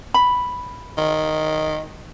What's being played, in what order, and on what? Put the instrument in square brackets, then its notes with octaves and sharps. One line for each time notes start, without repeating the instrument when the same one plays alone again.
[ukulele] B5
[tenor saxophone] D#3